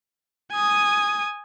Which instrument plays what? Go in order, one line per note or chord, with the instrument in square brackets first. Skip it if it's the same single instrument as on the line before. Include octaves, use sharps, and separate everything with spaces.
[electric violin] G#5 D#6